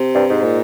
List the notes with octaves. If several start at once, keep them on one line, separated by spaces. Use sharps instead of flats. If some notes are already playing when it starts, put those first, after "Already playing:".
Already playing: C3
G2
G#2
A#2